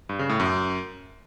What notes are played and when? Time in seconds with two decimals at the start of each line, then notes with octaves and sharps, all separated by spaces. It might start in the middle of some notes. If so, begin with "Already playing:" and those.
0.09 G2
0.19 C#3
0.29 A2
0.40 F#2